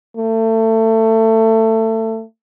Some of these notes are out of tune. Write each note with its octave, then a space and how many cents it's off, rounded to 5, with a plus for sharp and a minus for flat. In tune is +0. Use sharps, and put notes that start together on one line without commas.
A3 +25